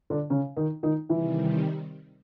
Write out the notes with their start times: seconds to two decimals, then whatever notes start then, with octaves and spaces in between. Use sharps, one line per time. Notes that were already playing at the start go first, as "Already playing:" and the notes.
0.10 D3 D4
0.30 C#3 C#4
0.57 D#3 D#4
0.83 D#3 D#4
1.09 C3 D#3 E3 G3 E4